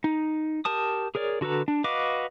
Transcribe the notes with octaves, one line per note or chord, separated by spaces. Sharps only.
D#4
G4 A#4 A5 D#6
G#4 A#4 C#5 D5
D3 F#4 A4 B4 A#5
D4
F#4 B4 D#5 F5 D6